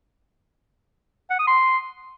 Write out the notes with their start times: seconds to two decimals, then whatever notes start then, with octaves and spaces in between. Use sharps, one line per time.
1.30 F#5
1.39 D#6
1.47 C6